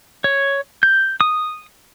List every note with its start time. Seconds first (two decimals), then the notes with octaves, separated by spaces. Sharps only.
0.24 C#5
0.83 G6
1.21 D#6